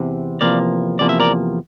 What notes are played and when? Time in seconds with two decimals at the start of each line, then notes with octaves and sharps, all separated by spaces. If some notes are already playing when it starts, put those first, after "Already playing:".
Already playing: E2 C3
0.41 E2 C3 F3 A#3 D5 F5
0.99 E2 C3 F3 A#3 D5
1.09 E5
1.20 A#4 D5